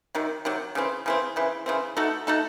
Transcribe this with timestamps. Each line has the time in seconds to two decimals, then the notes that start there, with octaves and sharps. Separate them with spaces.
0.15 C3 D#3 F#3
0.45 C3 D#3 F#3
0.75 C#3 E3 C4
1.06 C#3 E3 C4
1.36 C#3 E3 C4
1.66 C#3 E3 C4
1.97 A3 D#4 F#4 A4
2.27 A3 D#4 F#4 A4